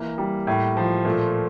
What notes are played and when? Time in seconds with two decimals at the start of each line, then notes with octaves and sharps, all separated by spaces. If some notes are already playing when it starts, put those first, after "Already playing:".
Already playing: E3 A#3
0.18 G3
0.47 A2
0.77 F3
1.05 A#2 A3